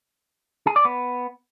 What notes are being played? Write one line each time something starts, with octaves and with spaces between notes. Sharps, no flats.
G#4
D5
B3